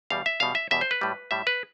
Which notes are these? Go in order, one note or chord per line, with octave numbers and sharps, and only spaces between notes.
E2 B2 G3 F5
E5
E2 B2 G3 F5
E5
E2 B2 G3 E5
C5
B4
A2 G3
A2 G3 E5
B4